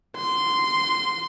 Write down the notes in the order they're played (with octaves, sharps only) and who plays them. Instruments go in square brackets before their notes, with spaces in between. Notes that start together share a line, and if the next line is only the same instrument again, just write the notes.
[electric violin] C6